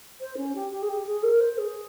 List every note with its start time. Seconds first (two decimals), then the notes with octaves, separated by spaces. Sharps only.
0.21 C5
0.37 C#4
0.55 G4
0.71 G4
0.82 G#4
0.88 G4
1.06 G#4
1.23 A#4
1.40 C5
1.58 G#4